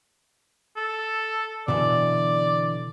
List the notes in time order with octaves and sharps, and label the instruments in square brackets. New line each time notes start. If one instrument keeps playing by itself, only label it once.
[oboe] A4
[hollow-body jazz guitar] B2 D3 E3 [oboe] D5